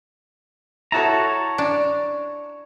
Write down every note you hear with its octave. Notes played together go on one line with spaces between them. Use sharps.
E4 F#4 A4 C#5 A5 A#5
D4